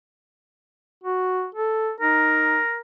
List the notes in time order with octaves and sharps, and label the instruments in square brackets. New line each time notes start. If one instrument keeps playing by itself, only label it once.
[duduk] F#4
A4
[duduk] D#4 [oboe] A#4